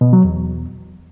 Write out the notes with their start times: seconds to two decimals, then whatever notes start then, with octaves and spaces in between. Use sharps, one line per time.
0.01 B2
0.13 F#3
0.25 E2